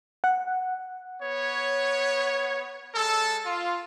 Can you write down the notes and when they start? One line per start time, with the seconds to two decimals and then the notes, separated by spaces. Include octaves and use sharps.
0.24 F#5
1.21 B3 C#5
2.94 G#3 A4
3.45 F4